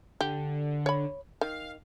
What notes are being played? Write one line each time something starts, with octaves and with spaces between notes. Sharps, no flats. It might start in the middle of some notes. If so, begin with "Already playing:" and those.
D3 G4
C#5 B5
D#3 F5